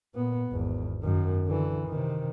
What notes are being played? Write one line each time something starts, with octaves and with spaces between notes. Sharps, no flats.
A#2 B3
G#1 E2
F#2 D#3
D3 E3
C3 D#3